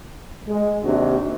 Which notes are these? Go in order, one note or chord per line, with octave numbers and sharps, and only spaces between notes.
G#3
D#2 C3 D4 F#4